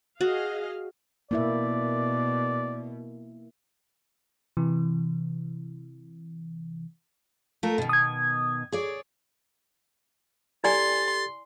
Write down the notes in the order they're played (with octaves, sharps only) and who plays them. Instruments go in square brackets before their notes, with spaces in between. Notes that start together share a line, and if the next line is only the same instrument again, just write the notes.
[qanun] F#4 [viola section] G#4 D#5 F5
[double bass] B2 [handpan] A#3 E4 E5 [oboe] D5
[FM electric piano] C3 E3
[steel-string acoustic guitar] A3 F4 A#4
B2 D#3
[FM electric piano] D#6 G#6
[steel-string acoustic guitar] G#4 C#5 D5
[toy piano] E4 D5 G#5 [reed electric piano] G4 A4 G#6 [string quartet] C6 [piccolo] A6